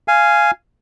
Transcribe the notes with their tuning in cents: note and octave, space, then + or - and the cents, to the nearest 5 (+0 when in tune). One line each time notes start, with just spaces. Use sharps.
F5 -15 G#5 +0